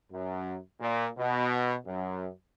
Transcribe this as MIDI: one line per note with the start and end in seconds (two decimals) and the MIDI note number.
0.11 0.55 42
0.80 1.07 46
1.18 1.76 47
1.86 2.29 42